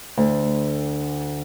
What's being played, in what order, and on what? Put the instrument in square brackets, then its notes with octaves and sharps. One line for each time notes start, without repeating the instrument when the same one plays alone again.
[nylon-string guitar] D2